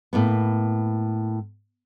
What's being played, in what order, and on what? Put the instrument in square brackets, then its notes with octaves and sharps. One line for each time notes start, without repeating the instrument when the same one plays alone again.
[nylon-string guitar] A2 A#3 B3